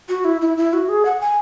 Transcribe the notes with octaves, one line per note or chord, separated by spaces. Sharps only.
F#4
E4
E4
E4
F#4
G#4
F#5
G#5